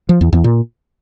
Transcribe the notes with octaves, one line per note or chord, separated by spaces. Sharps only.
F3
E2
E2
A#2